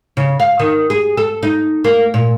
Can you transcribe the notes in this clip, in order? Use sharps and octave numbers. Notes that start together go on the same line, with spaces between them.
C#3
F5
D#3
G#4
A4
D#4
A#3
A#2